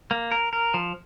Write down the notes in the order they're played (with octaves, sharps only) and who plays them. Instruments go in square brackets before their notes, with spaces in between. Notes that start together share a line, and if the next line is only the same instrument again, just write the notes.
[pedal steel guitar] A#3
A#4
A#4
F3